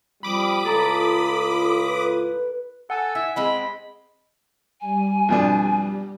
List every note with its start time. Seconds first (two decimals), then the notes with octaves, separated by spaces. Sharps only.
0.23 F2 G3 B5 D6 D#6
0.65 C#2 A2 F4 A4 A#5
1.89 B4
2.90 A4 F#5 G#5 E6
3.15 E4 E5
3.36 G#3 C4 D#5 B5
4.81 G3 G#5
5.28 F2 B2 D4